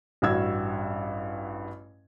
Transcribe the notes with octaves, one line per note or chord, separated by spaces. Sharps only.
A1 G2 F#4 E6 G#6